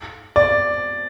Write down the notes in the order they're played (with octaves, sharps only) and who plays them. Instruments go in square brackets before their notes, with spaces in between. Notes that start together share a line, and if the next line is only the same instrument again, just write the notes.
[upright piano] D5